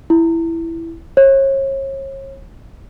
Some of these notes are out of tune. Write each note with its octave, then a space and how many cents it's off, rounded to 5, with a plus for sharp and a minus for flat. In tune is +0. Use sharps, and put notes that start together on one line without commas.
E4 +5
C#5 -35